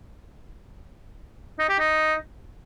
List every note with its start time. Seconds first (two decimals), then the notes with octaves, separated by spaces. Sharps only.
1.59 D#4
1.69 G4
1.79 D#4